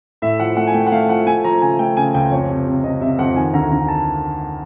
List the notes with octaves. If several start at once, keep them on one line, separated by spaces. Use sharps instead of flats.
A2 E5
F3 F#5
A3 F#5
G#5
A3 G5
F#5
A3 F5
F3 F#5
A3 G#5
F3 A#5
C#3 G#5
A3 G5
C#3 G#5
C#2 G5
F2 C#5
C3
C3
C3 D#5
C3 E5
F2 F#5
D#3 G#5
D2 A#5
D2 A#5
A5